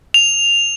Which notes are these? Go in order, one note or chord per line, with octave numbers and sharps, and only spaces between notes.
F7